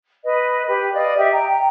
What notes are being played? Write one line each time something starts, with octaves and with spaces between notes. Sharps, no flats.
B4 D#5
G4 B4
D5 D#5 F5
G4 D#5 E5
G5 A#5